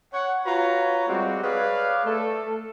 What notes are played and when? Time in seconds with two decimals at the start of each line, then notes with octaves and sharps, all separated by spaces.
0.13 C#5 F#5
0.46 F4 F#4 B4 C#5 A#5
1.09 G3 G#3 C4 F#4
1.44 G#4 B4 C#5 D5 F5
2.06 A3 A4